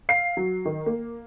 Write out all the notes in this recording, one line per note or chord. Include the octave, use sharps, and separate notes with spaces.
F5 C7
F#3
D#3
A#3